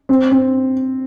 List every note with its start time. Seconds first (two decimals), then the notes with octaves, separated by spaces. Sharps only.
0.09 C4
0.32 C4